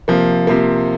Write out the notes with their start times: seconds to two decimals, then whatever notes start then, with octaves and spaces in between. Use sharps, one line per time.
0.08 C3 F3 A#3
0.47 C3 F3 A#3